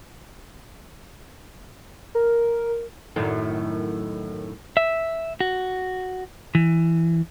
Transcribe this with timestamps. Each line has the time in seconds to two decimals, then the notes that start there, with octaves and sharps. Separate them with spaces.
2.15 A#4
3.16 F#2 A2 D#3
4.77 E5
5.40 F#4
6.55 E3